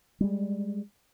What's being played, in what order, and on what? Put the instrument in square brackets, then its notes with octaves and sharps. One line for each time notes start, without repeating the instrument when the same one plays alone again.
[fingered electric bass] G3 G#3